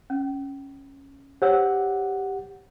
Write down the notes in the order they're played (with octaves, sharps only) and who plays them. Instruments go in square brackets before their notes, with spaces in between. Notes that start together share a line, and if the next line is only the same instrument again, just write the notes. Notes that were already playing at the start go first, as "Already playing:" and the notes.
[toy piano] C#4
[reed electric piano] G4 F#5 [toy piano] C5 C#5 E6